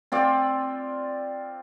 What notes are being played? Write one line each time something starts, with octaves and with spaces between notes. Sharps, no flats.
C4 F4 D5